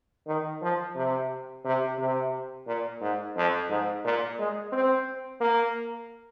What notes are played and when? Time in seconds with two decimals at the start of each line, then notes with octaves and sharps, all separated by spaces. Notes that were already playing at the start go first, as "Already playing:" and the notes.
0.27 D#3
0.62 F3
0.95 C3
1.65 C3
1.98 C3
2.67 A#2
3.01 G#2
3.36 F2
3.70 G#2
4.04 A#2
4.39 G#3
4.72 C4
5.41 A#3